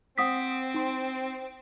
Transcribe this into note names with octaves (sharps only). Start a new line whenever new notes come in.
C4 F#5 D#6 B6
D#4 C6